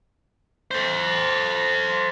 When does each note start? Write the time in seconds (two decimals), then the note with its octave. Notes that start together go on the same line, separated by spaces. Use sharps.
0.71 A4 C5